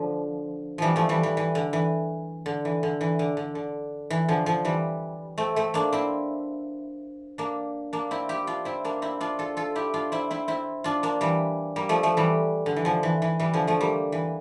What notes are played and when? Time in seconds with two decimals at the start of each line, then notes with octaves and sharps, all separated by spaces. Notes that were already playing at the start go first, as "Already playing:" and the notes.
Already playing: D3 F3
0.78 E3 F3 G3
0.96 F3 A3
1.09 E3 G3
1.23 E3
1.37 E3
1.55 D3
1.73 E3
2.46 D3
2.65 E3
2.83 D3
3.01 E3
3.19 D3
3.37 D3
3.55 D3
4.10 E3
4.28 D3 F3
4.46 D3 F3
4.65 E3 G3
5.38 A3 C4
5.56 A3 C4
5.74 A#3 D4
5.92 C4 E4
7.38 A#3 D4
7.93 A#3 D4
8.11 C4 E4
8.29 E4 G4
8.47 D4 F4
8.65 C4 E4
8.85 A#3 D4
9.02 C4 E4
9.21 D4 F4
9.39 F4 A4
9.57 F4 A4
9.75 E4 G4
9.94 D4 F4
10.12 C4 E4
10.31 C4 E4
10.48 C4 E4
10.84 D4 F4
11.03 A#3 D4
11.21 E3 G3
11.76 G3 A#3
11.89 F3 A3
12.03 F3 A3
12.17 E3 G3
12.66 D3
12.76 E3
12.85 D3 F3
13.03 E3
13.22 E3
13.39 E3 G3
13.53 D3 F3
13.67 F3 A3
13.81 G3 A#3
14.12 E3